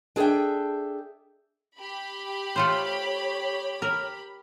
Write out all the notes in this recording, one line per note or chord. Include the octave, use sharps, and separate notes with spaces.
D4 G#4 A4 E5 G5
G4 B5
A3 F4 C5 C#5
A#4